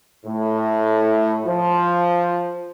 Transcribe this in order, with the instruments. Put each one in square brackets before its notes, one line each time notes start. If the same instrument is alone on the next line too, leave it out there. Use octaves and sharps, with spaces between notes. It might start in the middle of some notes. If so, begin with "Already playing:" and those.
[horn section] A2
F3